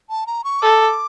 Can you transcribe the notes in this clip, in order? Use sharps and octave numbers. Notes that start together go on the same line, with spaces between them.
A5
A#5
C#6
A4 D6